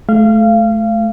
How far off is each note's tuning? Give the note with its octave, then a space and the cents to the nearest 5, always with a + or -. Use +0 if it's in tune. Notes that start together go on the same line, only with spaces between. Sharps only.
A3 -25 F5 -25